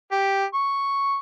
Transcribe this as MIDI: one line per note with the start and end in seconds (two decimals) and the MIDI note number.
0.12 0.44 67
0.54 1.18 85